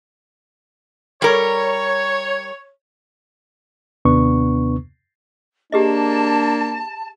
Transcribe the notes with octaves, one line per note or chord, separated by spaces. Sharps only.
G3 A#4 C#5
D#2 C3 B3 D4 B4 C#6
A#3 D4 G4 G#4 D#5 A5